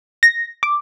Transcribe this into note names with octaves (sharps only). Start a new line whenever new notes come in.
A#6
D6